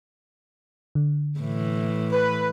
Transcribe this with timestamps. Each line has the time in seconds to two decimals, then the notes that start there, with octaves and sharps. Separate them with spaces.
0.95 D3
1.39 A2 E3
2.12 B4